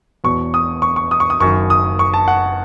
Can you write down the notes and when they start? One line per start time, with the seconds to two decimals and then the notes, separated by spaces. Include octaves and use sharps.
0.24 E1 E2 B2 C#6
0.54 D#6
0.82 C#6
0.96 C#6
1.11 D#6
1.20 C#6
1.30 D#6
1.40 F#1 F#2 D#3 C#6
1.70 D#6
1.99 C#6
2.14 A5
2.28 F#5